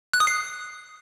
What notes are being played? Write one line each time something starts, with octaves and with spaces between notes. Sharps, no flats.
F#6
D#6
C7